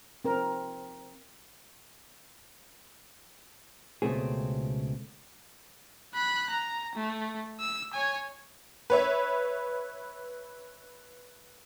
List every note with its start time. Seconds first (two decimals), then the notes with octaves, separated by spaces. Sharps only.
0.25 C4 A#4
4.02 C#2 B2 A3 C4 G#4
6.15 B5 F#6
6.50 A#5
6.95 A3
7.60 E6
7.93 C#5 G#5
8.90 B4 C#5 E5